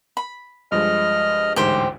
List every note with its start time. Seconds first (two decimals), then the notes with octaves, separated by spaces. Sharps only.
0.17 B5
0.72 G2 F3 G#3 D#5 F6
1.56 A1 D2 G#2 G4 C5